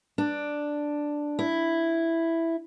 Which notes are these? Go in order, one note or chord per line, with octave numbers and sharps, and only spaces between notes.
D4
E4